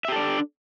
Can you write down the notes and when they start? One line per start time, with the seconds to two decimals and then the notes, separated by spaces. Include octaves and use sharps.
0.05 E5
0.08 G4
0.12 A4
0.16 D5
0.20 D4